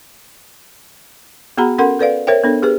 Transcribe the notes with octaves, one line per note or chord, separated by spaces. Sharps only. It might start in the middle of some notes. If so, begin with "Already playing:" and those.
B3 F#4 G#4 F#5 A#5 B5
C#4 A4 A#4 F#5 C6
A4 B4 D5 F5
A#4 C5 C#5 E5 G5
B3 D4 A4
G4 G#4 B4